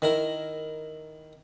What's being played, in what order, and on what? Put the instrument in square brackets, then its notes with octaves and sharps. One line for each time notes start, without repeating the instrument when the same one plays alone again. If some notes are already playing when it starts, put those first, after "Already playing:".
[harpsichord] D#3 E4 A#4